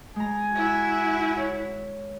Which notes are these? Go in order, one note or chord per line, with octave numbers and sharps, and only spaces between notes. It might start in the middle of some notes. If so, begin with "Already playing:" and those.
G#3 G#5 A#5
E4 F#4
C#5 E5